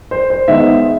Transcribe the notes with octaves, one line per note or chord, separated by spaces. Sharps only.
C5
C5
D#3 G#3 B3 E5